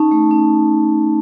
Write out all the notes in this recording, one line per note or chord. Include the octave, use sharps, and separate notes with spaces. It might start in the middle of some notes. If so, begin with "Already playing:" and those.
Already playing: C#4 D#4 A5
A3
C#4